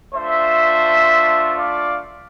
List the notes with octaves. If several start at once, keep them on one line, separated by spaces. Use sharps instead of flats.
A3 D4 F4 C5 E5
D5 F5